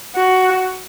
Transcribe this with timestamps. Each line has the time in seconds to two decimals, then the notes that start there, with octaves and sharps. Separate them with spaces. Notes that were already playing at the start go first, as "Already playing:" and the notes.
0.16 F#4